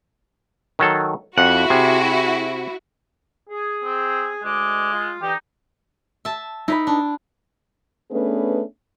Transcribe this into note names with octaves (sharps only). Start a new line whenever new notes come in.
D#3 F#3 A4
F2 E4 F#4 F#5
C3 G#4
G#4
C4
D2 G#3 D#5 D6
F4
D3 E3 D#4 G4
E5 A5
D#4 E4 B4 B5
D4
A3 B3 C#4 D4 G#4 B4